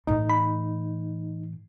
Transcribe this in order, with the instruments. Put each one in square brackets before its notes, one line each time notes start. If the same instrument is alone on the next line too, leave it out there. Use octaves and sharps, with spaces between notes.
[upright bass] A2 E3 [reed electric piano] D#4
[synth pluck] B5